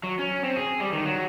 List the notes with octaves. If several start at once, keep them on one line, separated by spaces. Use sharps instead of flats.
F#3
C#4
C4
G#4
G3
D#3
F#3